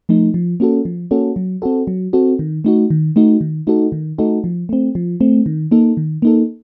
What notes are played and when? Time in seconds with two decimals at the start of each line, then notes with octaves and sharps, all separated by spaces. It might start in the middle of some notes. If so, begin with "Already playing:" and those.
0.09 F3 A3 D#4
0.34 F3
0.60 A#3 C#4 F#4 A4
0.85 F3
1.11 A#3 C#4 F#4 A4
1.36 F#3
1.62 C4 F#4 A4
1.87 F#3
2.13 C4 F#4 A4
2.39 D#3
2.64 A3 D#4 F#4
2.90 D#3
3.16 A3 D#4 F#4
3.41 D#3
3.67 A3 D#4 F#4 A4
3.92 D#3
4.18 A3 D#4 F#4 A4
4.44 F3
4.69 A3 C4
4.95 F3
5.21 A3 C4
5.46 D#3
5.71 A#3 D#4 A4
5.97 D#3
6.22 A#3 D#4 A4